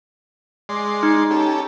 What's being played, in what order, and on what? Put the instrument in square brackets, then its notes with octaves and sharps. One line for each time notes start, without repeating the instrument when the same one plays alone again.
[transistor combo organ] G#3 D5 C6
[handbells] D#4
[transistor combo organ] C#4 G4 A4